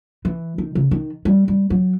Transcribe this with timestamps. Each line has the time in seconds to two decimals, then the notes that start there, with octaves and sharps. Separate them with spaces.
0.25 E3
0.58 D#3
0.75 C#3
0.91 D#3
1.25 G3
1.48 G3
1.70 F#3